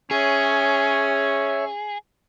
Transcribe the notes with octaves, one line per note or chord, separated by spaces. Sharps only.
C#4 G#4 C#5 E5